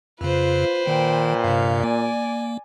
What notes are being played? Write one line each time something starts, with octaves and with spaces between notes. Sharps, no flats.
F2 C#3 F4 B4 C5
A#2 D#3 G5
G2 C3 F5
A#3 D5 G#5